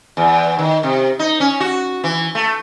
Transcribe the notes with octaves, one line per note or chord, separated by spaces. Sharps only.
E2
D#3
C3
D#4
C#4
F#4
E3
A3